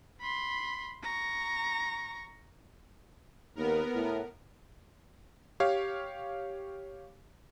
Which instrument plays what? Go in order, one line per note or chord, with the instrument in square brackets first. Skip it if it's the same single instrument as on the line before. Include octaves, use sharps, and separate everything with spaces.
[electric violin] B5 C6
A#5 C#6
[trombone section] D#2 [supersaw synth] B3 A#4
[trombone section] A2
[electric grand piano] G4 C#5 F5